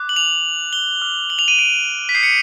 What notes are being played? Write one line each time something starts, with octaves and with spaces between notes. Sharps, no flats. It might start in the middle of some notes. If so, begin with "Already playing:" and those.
Already playing: D6 F#6
F#7
F7
G7
D6 F6
F#7
F7
D#7
D7
B6
D#6 G6 C7
C#7